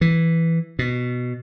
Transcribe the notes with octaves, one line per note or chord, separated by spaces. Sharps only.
E3
B2